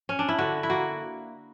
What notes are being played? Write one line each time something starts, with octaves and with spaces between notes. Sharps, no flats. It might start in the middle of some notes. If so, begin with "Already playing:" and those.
C#4
D4
E4
D3 F#4
E4
A#3 F#4